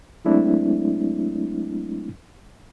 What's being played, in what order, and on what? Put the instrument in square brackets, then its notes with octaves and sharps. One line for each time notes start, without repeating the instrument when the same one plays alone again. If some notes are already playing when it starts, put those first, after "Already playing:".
[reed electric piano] F#3 G#3 A3 C4 D4 E4